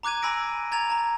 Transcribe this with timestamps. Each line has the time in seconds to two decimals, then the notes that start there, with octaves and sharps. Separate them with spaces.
0.03 A#5 D6 F#6 G#6 D#7
0.22 G#5 B5 E6 A#6 D7
0.72 A#5 G#6 A6 F7
0.90 A5 A#5